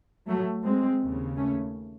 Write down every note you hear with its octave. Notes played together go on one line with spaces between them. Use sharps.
F#3 A3
G#3 C4
D#2 C#3
A3 C#4